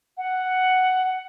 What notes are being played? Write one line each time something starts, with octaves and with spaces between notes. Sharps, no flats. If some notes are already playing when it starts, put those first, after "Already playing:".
F#5